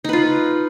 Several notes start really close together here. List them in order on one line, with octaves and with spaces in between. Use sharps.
D#4 B4 F4